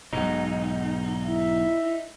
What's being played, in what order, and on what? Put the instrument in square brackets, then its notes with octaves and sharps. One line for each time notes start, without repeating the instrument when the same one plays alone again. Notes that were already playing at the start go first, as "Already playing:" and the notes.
[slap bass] B1 G#2 B2 [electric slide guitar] D#4
[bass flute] E4 [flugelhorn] E5